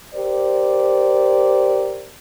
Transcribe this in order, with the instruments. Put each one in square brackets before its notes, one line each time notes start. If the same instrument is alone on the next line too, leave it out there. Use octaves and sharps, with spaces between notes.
[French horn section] G4 A#4 C5 D5